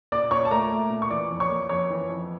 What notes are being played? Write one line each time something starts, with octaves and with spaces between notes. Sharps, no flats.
A#2 D5 D6
A#2 C#5 C#6
A5
A3 A#4 A#5
A3
A#2
C#6
E3 D5 D6
F2
C#5 C#6
A#3
F2 C#5 C#6
E3
F2